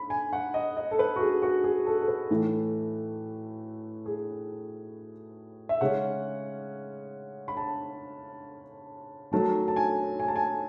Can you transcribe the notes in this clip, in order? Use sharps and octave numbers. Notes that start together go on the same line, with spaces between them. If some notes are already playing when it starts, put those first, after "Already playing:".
Already playing: B5
G#5
F#5
D#5
D#5
A4
B4
F#4
G#4
F#4
G#4
A4
A4
B4
A2 E3 A3
G#4
E5
C#3 G#3 C#4 F#5
B5
A5
D#3 F#3 A3 C#4 A5
A5
G#5
G#5
A5
G#5